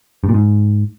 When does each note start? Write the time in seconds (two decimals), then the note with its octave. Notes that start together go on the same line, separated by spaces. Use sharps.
0.24 G2
0.29 A#2
0.34 G#2